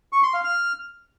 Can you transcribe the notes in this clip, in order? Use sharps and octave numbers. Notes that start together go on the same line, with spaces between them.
C#6
C6
F5
F6